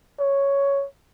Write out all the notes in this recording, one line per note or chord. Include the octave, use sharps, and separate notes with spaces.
C#5